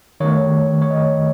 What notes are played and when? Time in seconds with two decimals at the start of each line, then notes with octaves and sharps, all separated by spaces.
0.20 D#3 A3 C#5
0.82 C#5
0.91 D#5